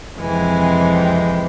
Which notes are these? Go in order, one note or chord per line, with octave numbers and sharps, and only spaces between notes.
F2 C3 E3 G#3 G#5
G5